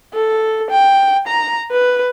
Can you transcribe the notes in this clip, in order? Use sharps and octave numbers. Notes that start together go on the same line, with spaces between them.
A4
G5
A#5
B4